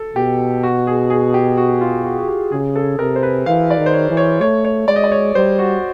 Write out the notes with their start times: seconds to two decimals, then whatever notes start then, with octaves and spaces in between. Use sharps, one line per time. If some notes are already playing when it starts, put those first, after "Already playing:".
Already playing: A4
0.16 B2 G4
0.63 F#4
0.87 G#4
1.10 G#4
1.34 G4
1.57 F#4
1.81 F4
2.05 F#4
2.18 F#4
2.28 G4
2.52 C#3 G#4
2.76 A4
2.99 C3 A#4
3.16 C5
3.23 B4
3.46 E3 F5
3.70 D5
3.78 D#3
3.86 C5
3.93 C#5
4.10 E3
4.17 C#5
4.41 A3 C#5
4.65 C#5
4.88 G#3 D5
4.96 D#5
5.04 D5
5.12 C#5
5.35 G3 C5
5.59 F#4